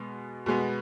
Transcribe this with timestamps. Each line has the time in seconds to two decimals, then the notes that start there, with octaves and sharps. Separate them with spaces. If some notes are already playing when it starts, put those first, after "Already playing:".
Already playing: B2 G#3 B3
0.46 B2 G#3 B3